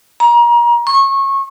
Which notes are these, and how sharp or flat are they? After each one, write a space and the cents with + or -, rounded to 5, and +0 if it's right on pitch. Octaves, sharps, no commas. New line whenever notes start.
A#5 +30
C#6 -25